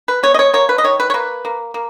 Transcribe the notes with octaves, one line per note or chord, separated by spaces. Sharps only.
B4
B3 C#5
D#5
C#5
A#3 C#5
B4
D#5
D#3 C#5
B4
C#5
A#3 B4
A#3
A#3